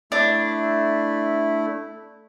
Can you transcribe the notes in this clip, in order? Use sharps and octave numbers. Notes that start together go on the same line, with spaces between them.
A3 D4 E4